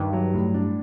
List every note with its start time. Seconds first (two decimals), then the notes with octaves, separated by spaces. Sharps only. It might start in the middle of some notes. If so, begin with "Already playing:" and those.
Already playing: G2 D#3
0.13 F#3
0.34 A2
0.54 D4